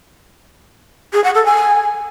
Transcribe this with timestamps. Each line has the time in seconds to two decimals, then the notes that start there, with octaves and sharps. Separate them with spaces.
1.13 G#4
1.24 F#5
1.35 A4
1.46 G#5